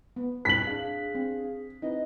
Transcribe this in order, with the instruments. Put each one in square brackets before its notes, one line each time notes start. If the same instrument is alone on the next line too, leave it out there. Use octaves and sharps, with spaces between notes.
[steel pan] B3
[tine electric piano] G2 A#2 [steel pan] C4 [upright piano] B6 F#7
[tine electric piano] D4 F5 [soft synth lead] G#4
[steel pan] C4
[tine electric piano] C4 [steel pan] D#4 E4 B4 [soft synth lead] D#5